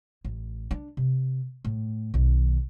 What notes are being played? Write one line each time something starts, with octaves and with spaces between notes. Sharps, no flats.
A1
D4
C3
A2
B1 D#3